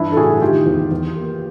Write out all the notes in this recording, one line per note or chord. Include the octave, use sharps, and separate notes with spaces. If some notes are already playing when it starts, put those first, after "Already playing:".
Already playing: G2 E3 D4 E4
A4
A2 F#4 G#4
D#3 F4 G4
E2
E2
A#3